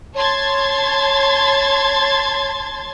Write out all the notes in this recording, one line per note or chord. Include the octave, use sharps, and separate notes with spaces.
C#5 A5 C6 G#6 A6